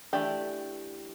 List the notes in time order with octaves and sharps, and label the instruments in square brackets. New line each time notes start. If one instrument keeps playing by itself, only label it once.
[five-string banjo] E3 A3 D4 G4